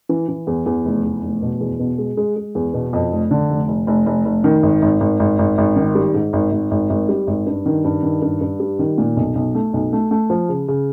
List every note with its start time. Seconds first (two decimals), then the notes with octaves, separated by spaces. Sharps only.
0.09 E3
0.28 E3
0.47 E2
0.66 E2
0.85 F1
1.04 E2
1.23 F1
1.42 B2
1.61 E2
1.79 B2
1.98 G#3
2.17 G#3
2.36 G#3
2.55 E2
2.74 B2
2.93 F2
3.12 F1
3.31 D3
3.50 F1
3.68 F1
3.87 F1
4.06 F1
4.25 F1
4.44 D#3
4.63 G#1
4.82 G#1
5.01 G#1
5.20 G#1
5.39 G#1
5.58 G#1
5.76 D#3
5.95 G3
6.14 G#2
6.33 G#1
6.52 G#1
6.71 G#1
6.90 G#1
7.09 G3
7.27 G#1
7.47 G2
7.66 D#3
7.84 G2
8.03 D#3
8.22 G2
8.41 G2
8.60 G3
8.79 D#3
8.98 A#2
9.17 B1
9.35 B1
9.55 A3
9.74 B1
9.93 A3
10.11 A3
10.30 F3
10.49 C#3
10.68 C#3